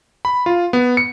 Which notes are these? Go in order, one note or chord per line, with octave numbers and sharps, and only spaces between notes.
B5
F4
B3
C#7